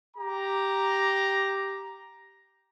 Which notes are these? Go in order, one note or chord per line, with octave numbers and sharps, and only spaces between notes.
G4 A#5